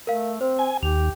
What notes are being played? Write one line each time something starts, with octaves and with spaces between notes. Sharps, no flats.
A3 A#4 F5
C4 C5
G#5
D#2 G4 F7